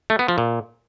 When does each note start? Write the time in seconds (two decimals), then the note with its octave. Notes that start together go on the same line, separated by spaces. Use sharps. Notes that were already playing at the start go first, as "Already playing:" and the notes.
0.10 A3
0.19 B3
0.28 F3
0.38 A#2